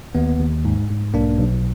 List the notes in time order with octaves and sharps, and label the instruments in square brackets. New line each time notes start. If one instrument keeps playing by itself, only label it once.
[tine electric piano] D#2 B3
D#2
G#2
G#2
B1 A#3 D4
B1